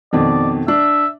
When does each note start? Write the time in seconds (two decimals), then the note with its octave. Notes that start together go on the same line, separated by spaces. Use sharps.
0.13 F2 B2 D#3 D5
0.68 D4 E5